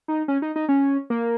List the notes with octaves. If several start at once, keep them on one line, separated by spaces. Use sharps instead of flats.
D#4
C#4
D#4
D#4
C#4
A#3